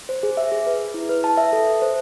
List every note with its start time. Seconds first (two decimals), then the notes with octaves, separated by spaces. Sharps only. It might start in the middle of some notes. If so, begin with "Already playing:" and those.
0.09 C5
0.23 G#4
0.37 E5
0.52 G#4
0.66 B4
0.80 B4
0.94 E4
1.09 B4
1.24 A5
1.37 E5
1.53 A4
1.67 E5
1.82 C5